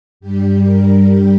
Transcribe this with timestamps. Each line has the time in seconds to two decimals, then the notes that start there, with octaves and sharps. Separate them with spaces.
0.20 G2 G3 G4
0.63 A#4
1.05 G4